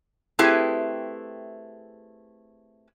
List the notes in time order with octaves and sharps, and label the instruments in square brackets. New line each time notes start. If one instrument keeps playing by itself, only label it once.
[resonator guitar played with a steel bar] A3 C4 E4 G4 G#4 B4